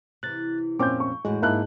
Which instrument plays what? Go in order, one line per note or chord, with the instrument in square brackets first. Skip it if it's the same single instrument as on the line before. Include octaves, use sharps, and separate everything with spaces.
[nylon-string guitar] C3 E3 [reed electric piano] F#6 A6
[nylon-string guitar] F2 F5 [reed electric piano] A#2 C4 C#4 [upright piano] D6 G6
[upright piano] C#6
[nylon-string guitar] E2 A2 F#4 [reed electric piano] G#3
[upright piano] G#2 A5 F#6 [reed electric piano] A#3 E4 [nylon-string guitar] D4 G#4